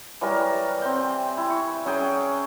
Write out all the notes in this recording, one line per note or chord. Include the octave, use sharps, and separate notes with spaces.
E3 F#3 G3 A#4
C4 G5
E4
C#6
F#3 C#4 G#4 G5